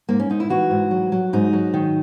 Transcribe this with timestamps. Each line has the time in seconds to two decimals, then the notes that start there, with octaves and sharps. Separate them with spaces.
0.09 G#2 A#3
0.20 C#4
0.30 G#2 D#4
0.40 E4
0.50 E3 F#4
0.71 G#2
0.91 F#3
1.12 F#3
1.33 G#2 D#4
1.53 F#3
1.74 D#3